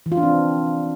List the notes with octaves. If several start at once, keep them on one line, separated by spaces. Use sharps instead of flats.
E3
F4
D4
C4